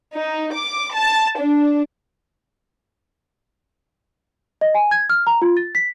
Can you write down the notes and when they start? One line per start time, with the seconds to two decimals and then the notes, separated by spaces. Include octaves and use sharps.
0.15 D#4
0.53 D6
0.95 A5
1.38 D4
4.61 D#5
4.74 G#5
4.91 G#6
5.10 F6
5.27 A#5
5.42 F4
5.57 A6
5.75 B6